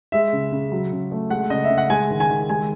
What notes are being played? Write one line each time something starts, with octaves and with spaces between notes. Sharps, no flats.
G#3 E5
C#3
C#3
F#3
C#3
A3
G#3 F#5
C#3 D#5
E5
C#3
F#5
G#3 G#5
D#3
G#5
D#3
G#3 G#5